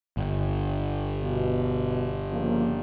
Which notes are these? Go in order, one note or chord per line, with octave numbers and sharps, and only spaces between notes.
G1
B2
C#3 F3 A#3